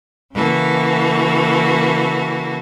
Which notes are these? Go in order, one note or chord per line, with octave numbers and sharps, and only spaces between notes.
C#3 E3 A#3 F#4 A4